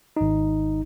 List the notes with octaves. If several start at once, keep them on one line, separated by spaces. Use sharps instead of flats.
G#1 D#4